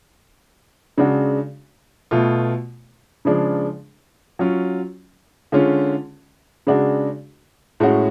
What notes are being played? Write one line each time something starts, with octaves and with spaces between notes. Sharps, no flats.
C#3 G#3 D4 F#4
B2 A3 F4
C#3 F3 G#3 D4
F#3 C#4 F4
D3 G#3 C#4 F4
C#3 G#3 D4 F#4
A2 G#3 C#4 F#4